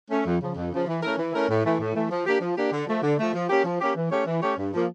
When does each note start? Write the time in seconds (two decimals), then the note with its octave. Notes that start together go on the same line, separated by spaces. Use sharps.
0.10 A3 C#4
0.26 F2
0.40 C#3 F3
0.56 F2
0.72 C#3 F3
0.87 E3
1.03 A3 C#4 E4 A#4
1.18 E3
1.34 A3 C#4 E4 A#4
1.49 A2
1.64 E3 A3
1.80 A2
1.94 E3 A3
2.10 F3
2.26 A#3 D4 G4
2.41 F3
2.57 A#3 D4 G4
2.73 D3
2.87 F3 A3
3.03 D3
3.19 F3 A3
3.34 F3
3.49 A#3 C#4 G4
3.65 F3
3.80 A#3 C#4 G4
3.96 E3
4.11 A3 C#4 G4 C#5
4.27 E3
4.42 A3 C#4 G4 C#5
4.57 G2
4.73 F3 A#3